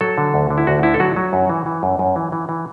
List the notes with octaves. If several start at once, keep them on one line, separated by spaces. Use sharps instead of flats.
F#3 A4
D3
D2
D3
E4
D2 F#4
D3 E4
A4
F#3 F#4
F#3
F#2
E3
E3
F#2
F#2
E3
E3
E3